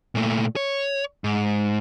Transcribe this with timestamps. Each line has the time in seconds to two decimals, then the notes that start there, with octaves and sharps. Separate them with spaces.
0.15 A#2 A3
0.56 C#5
1.24 G#2